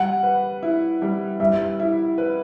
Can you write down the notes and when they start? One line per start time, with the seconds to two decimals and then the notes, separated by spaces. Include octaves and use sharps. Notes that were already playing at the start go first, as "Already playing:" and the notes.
Already playing: G3 F#5
0.23 B4
0.63 E4
1.02 G3
1.40 G3 E5
1.80 E4
2.18 B4